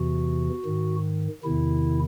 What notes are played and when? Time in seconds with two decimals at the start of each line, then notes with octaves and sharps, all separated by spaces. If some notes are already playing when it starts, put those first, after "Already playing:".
Already playing: E2 C3 E3 F#4
0.65 G#2 D#3
1.44 E2 C3 D#3 E4